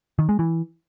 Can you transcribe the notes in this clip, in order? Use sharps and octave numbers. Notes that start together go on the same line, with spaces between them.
D#3
G#3
E3